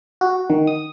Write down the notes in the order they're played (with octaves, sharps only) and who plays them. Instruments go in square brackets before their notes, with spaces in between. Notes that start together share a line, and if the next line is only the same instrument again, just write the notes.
[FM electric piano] F#4
D#3
D#6